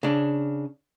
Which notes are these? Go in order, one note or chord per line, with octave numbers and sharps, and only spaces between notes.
C#3 D4